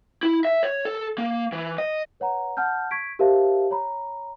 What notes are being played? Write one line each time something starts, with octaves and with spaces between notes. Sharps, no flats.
E4
E5
C#5
A4
A#3
E3
D#5
B4 C#5 F#5 A#5
F#5 A5 F6 G6
C#6 G#6 B6 D7
G4 A#4 C5 E5 F5 A5
C#5 A#5 B5